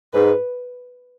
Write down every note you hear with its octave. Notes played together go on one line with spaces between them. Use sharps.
G#2 B4